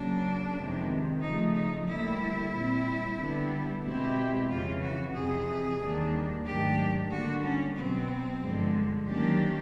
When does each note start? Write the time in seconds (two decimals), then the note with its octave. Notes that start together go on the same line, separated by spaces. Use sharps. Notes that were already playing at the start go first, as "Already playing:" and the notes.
Already playing: C#3 F#3 A#3 D4
0.56 F2 C3 D#3 G#3 B3
1.21 C#3 F3 A3 D#4
1.54 D#4
1.87 D2 D3 G3 A#3 E4
2.53 A#2 G3 C4
3.18 D3 G3 B3
3.84 B2 G#3 C4 E4 G4
4.49 F2 C#3 E3 F4
4.82 F#4
5.14 F2 C3 E3 G#4
5.80 D#2 D#3 G3 A#3 D4
6.45 G#2 D#3 F#3 A3 D4 G4
7.10 D3 G3 A#3 D4 F#4
7.43 C#4
7.76 B2 F#3 B3 C4
8.42 G2 D3 F3 G#3
9.08 D#3 F#3 A#3 C#4 D4 G4